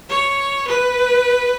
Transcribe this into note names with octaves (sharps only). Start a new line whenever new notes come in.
C#5
B4